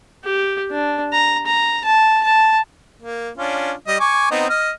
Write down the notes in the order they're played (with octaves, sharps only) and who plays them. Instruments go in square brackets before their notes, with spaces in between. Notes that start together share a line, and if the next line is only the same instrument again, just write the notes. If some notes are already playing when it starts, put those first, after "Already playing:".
[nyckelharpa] G4
D4
A#5
A#5
A5
A5
[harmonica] A#3
C#4 D4 F4
G3 D#5
G#5 C#6 D6
B3 C4 D#4
D#5 F6